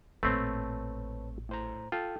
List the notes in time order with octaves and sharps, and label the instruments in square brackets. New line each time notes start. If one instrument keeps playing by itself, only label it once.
[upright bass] A1 A#2 [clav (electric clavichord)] A3 C4 [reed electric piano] B4 C#5 A5
[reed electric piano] A2 C5 A#5
[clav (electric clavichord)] F4 [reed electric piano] A4 G5